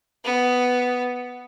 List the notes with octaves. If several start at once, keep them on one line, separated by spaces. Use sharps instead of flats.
B3